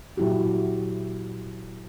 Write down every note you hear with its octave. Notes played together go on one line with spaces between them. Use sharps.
A#2 F#3 E4 F#4 G4